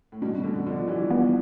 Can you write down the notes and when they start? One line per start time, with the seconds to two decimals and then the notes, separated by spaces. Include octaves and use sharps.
0.12 A2
0.22 G2 B2
0.44 B2 D3
0.66 D3 F3
0.88 E3 G3
1.10 B3